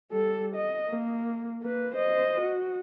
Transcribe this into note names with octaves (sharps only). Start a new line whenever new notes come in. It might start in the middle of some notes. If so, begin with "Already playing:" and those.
G3 A4
D#5
A#3
A#3 B4
C5 D#5
F#4